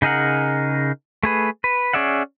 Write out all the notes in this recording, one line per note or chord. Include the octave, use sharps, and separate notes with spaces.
C#3 D#4 G#4 A#4 F#5
A3 G#4 B4
B4
C#4 G#4 D5 E5 F#5